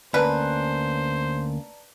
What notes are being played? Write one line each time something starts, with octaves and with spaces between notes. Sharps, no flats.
D2 A#3 C#4 B4 C5 D5 A5 A#5